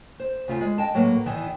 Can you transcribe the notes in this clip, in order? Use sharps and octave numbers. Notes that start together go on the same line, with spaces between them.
C5
D2 C#3 F4 E5 F#5 G#5
G#3
D#5 G5 A5
A2 F#3 A#3 B4
E2 D#3 E3 G#5